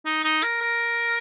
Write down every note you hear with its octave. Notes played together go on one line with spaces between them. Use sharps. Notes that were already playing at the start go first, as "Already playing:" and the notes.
D#4
D#4
A#4
A#4